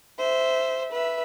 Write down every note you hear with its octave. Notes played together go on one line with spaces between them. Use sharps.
C5 E5
B4 E5